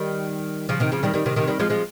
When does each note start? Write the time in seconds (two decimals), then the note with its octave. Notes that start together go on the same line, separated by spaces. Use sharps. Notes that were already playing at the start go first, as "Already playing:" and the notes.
Already playing: D#3 G3
0.69 C#3 F3
0.80 C3 D#3
0.92 C#3 F3
1.03 D#3 G3
1.14 D#3 G3
1.26 C3 D#3
1.36 C3 D#3
1.47 D#3 G3
1.60 F3 G#3
1.70 F3 G#3